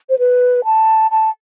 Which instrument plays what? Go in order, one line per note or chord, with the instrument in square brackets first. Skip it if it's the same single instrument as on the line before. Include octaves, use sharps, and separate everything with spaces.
[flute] C5
B4
A5
A5